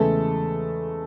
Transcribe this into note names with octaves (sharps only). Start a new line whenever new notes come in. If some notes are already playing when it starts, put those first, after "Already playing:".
Already playing: E2 C#3 G#3 A3 A4